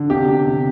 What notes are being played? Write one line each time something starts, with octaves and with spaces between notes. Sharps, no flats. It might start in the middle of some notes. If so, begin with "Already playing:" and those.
Already playing: D3
C3 G4
C3
C3